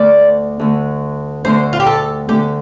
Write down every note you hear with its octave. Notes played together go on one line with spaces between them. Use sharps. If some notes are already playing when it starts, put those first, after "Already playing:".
Already playing: D2 D3 A3 D5
D2 D3 A3
D2 D3 A3 C5
F4
G4
A4
D2 D3 A3 G4